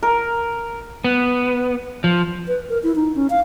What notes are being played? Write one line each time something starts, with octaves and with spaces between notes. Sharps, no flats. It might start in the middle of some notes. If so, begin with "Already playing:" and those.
A#4
B3
F3
B4
A#4
E4
D#4
C#4
F5